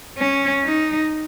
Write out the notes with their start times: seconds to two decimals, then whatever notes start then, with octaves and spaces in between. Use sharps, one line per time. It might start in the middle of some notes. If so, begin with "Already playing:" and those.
0.18 C#4
0.64 D#4